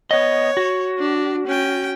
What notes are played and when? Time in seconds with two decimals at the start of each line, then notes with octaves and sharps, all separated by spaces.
0.11 B3 C#5 D#5
0.57 F#4
0.99 D4
1.47 C#4 G5